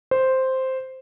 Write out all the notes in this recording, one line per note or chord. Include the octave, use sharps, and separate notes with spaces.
C5